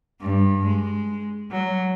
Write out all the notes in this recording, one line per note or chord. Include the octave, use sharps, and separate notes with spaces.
G2
G#3
F#3